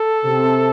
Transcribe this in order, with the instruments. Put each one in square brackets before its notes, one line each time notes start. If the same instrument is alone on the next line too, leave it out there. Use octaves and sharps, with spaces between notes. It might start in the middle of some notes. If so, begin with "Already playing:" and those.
Already playing: [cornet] A4
[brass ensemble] C3